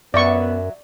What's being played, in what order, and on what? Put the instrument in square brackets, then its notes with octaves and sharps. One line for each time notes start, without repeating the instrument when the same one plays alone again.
[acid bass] F#2 [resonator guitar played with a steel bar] F#3 E5 [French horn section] B3 [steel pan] D5 C#6